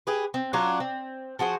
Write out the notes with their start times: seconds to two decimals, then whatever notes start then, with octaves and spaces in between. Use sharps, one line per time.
0.07 G4 G#4 B4
0.34 C4
0.53 F#3 C#4 D4 F4
0.80 C4
1.39 F3 F#4 G#4 C5